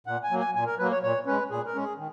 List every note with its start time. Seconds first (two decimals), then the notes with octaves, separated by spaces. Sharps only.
0.07 A#2 F#5
0.23 G#5
0.30 F#3 A#3
0.40 G#5
0.55 A#2 G#5
0.66 A#4
0.79 F#3 A#3 B4
0.91 C#5
1.03 A#2 C#5
1.26 G#3 C#4 B4
1.50 A#2 G#4
1.66 A#4
1.74 G#3 C#4
1.82 G#4
1.98 D#3